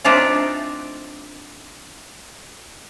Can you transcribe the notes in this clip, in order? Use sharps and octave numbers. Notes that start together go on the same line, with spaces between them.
A3 C4 D4 D#4 F4